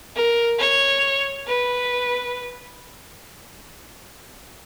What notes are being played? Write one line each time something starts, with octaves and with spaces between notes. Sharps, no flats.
A#4
C#5
B4